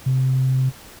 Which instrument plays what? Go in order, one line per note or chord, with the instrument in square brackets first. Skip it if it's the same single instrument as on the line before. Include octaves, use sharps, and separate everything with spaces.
[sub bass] C3